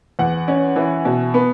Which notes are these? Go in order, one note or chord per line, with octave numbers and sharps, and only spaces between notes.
E2 F#5
C#4
E3
B2
B3